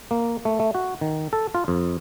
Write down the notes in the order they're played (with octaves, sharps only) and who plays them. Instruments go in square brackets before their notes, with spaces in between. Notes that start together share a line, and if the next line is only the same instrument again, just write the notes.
[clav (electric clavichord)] A#3
A3
A3
F#4
D#3
A4
F4
F2